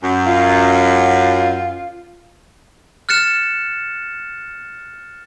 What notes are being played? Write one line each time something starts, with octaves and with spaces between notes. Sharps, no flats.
F#2
F4
F6 F#6 A6 C#7 E7